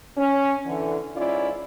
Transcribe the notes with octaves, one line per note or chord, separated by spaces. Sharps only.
C#4
D3 E3
G#2 C#4 E4 F4 D5